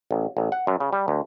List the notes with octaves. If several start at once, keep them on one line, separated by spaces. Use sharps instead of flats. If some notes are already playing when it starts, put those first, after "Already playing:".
A1
A1
F#5
F#2
C#3
G3
D2